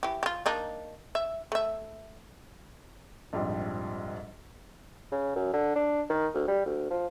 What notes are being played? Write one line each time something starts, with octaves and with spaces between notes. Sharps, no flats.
E3 G4
F4 G4
A#3 D4 D#4
E5
A3 E5
A#1 F2 G#2 F3 G3
C#3
F#2
D3
D4
D#3
D2
G3
D2
F3